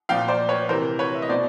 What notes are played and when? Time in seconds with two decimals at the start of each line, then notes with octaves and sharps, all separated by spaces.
0.09 A#2 F3 F5 G5
0.28 C5 D5
0.49 B4 C#5
0.69 C3 E3 A#4 C5
0.99 B4 C#5
1.15 E5
1.22 D#5
1.29 B2 C5 D5